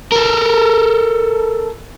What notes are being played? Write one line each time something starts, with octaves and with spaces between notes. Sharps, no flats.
A4 A#4